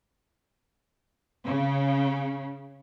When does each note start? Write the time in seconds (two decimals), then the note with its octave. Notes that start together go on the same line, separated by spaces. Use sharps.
1.45 C#3